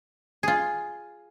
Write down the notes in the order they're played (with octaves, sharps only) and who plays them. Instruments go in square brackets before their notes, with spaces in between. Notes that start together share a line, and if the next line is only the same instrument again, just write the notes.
[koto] F4 G#4